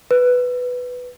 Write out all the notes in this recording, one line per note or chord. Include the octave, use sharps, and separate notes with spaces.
B4